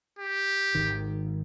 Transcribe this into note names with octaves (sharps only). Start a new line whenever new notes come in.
G4
G#1 D#3